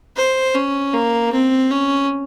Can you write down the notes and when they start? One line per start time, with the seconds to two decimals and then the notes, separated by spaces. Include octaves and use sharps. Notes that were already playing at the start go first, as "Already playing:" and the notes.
0.17 C5
0.55 C#4
0.94 A#3
1.32 C4
1.71 C#4